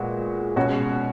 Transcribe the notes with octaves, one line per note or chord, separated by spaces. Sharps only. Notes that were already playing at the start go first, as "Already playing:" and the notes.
Already playing: A#2 G#3 B3 F#4
B2 G#3 C#4 F#4